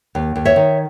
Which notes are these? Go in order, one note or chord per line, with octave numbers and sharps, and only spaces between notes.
D#2
D#2
C#5 E5
D#3